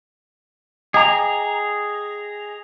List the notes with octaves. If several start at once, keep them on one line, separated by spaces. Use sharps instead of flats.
G#4 D#5 G5 A#5 D6